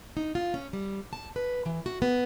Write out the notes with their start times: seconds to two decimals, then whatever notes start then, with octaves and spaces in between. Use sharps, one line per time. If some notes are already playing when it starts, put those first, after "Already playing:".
0.17 D#4
0.35 F4
0.54 C#4
0.73 G3
1.13 A5
1.36 B4
1.66 E3
1.86 F#4
2.02 B3